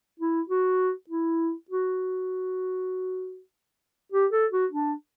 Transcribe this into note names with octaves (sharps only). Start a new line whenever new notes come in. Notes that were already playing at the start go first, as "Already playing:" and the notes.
E4
F#4
E4
F#4
G4
A4
F#4
D4